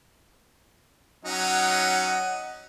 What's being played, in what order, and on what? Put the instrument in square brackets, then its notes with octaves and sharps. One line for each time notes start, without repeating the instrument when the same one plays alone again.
[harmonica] F#3 C#4 D#4 [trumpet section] D#5 F#5